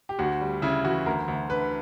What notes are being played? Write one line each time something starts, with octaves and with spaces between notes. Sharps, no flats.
G4
D2 F#4
G3
C#3 E4
E3 F#4
D2 A#4
D2
D3 B4